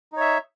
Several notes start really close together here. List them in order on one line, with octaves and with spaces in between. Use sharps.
D#4 C#5 E5